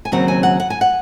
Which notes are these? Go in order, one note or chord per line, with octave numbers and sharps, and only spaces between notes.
G#5
D#2 C#3 F#3 C4 F#5
G#5
F#5
F#5
G#5
F#5